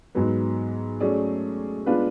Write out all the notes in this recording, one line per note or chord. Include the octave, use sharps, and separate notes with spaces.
G#2 F#3 B3
F#3 A3 C#4 G#4 D5
G#3 B3 D4 F4 B4